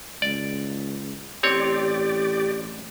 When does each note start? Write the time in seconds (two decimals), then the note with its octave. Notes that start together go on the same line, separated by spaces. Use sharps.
0.22 C#2 D5
1.43 A1 C4 G4 C#5 D5